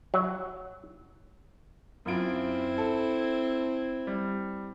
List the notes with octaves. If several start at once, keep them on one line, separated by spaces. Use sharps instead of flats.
F#3
F#2 C4 E4 F4 D7
A4
G3